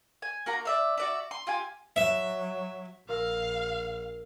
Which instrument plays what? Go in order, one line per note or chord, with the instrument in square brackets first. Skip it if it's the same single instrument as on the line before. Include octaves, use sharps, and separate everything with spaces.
[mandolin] G#5
A#3 F#4 A#5
D5 E5 F5
F#4 D5 E5
C6
F4 G4 G#5
[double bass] F#3 [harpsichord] E5
[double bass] A#1 [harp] A#4 E6 [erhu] F5